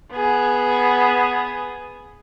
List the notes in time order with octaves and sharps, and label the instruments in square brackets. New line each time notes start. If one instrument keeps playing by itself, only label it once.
[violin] B3 G#4